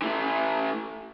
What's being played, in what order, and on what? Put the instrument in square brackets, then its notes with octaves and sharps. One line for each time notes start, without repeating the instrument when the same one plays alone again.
[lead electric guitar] E3 A3